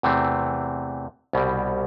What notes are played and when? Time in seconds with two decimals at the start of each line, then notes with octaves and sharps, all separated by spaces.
0.03 E2 C3 E3 A3 C4
1.33 C2 B2 G3